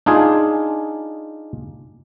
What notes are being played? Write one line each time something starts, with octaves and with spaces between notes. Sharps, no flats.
D4 D#4 F4 G#4 G#5